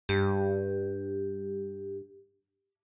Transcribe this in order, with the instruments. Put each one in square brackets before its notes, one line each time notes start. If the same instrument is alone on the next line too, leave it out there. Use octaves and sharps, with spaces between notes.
[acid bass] G2 [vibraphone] G4